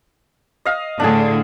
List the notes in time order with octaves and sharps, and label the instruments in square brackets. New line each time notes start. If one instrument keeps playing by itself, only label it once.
[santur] D#5 F5
[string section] A2 D3 [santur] D4 G#4